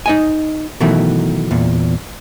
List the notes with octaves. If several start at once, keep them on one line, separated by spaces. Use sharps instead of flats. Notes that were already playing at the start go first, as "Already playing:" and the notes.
D#4 D#5 G#5
B2 D#3 E3 F#3 A3
E2 A#2